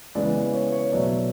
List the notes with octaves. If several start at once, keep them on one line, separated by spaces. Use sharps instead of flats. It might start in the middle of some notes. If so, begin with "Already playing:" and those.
C#3 E3 G#3 B3 D5
C#5
C#5
B2 F#3 A3 D5